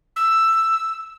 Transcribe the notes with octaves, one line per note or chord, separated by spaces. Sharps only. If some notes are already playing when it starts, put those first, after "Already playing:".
E6